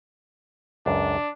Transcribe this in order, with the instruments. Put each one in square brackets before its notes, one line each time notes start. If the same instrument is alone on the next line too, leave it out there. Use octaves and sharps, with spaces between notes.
[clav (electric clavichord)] C#2 F#2 [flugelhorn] D4